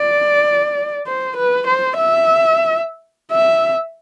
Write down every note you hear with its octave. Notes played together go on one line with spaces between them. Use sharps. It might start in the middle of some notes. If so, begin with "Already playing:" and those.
Already playing: D5
C5
B4
C5
E5
E5